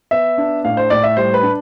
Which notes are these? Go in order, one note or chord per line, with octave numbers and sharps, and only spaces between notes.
B3 E5
D4
A2 F5
C5
A2 D5
E5
G3 C5
B4
D4